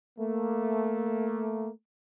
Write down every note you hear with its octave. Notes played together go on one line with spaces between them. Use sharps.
A3 A#3